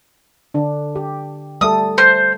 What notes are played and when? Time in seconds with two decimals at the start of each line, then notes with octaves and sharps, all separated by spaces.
0.54 D3 D4
0.96 G4
1.61 G3 A3 A4 D#6
1.98 C5